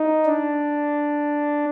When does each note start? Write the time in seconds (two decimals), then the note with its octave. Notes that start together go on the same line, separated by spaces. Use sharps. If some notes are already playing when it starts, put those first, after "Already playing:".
Already playing: D#4
0.26 D4